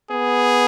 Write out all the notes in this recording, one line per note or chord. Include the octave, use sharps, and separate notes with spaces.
B3 G#4